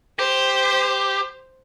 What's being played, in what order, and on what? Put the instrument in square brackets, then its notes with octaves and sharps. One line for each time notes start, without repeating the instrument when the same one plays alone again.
[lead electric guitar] G4 [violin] C5